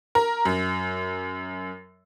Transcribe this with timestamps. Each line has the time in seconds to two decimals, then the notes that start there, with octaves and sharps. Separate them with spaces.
0.15 A#4
0.45 F#2